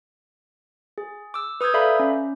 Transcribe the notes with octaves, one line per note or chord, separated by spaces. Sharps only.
G#4
D6 E6
B4 D#6 E6 G6 G#6
A4 D5 E5 F5 A#5 B5
C#4